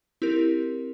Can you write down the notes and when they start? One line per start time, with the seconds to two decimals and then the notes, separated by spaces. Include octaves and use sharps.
0.22 C4 E4 G4 A#4